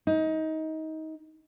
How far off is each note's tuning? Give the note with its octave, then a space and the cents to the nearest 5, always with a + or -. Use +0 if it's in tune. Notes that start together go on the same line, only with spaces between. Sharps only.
D#4 +25